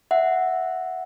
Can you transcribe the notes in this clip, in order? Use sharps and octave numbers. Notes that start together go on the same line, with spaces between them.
E5 F#5